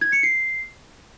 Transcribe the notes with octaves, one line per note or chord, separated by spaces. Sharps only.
G#6
C#7
C7